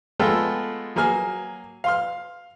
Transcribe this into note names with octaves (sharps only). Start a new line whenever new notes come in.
G#3 A3 B3 F4 A4 G5
F#3 A#3 G#4 G#5 F6
F5 C6 F6